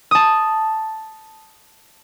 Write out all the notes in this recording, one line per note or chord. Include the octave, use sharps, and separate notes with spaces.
A5 D#6